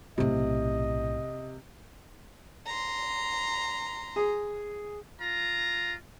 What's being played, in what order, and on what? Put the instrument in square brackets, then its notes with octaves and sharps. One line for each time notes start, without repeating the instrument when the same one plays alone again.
[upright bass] B1 A2 [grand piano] C3 [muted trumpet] D#5
[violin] A#5 C6
[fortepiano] G#4
[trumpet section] F4 A#5